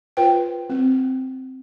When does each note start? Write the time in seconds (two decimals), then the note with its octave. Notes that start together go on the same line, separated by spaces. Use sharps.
0.17 F4 B4 C5 G5
0.70 C4